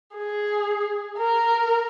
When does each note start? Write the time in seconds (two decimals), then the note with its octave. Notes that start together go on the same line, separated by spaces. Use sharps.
0.16 G#4
1.18 A#4